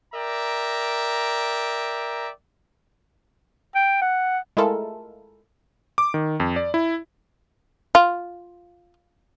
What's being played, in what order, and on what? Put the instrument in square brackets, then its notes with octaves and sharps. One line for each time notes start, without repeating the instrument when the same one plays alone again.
[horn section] A#4 D5 E5 G5 A#5
[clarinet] G5
F#5
[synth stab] G#3 A3 E4 F4 A4 A#4
[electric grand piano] D6
D#3
F2
D5
E4
[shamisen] F4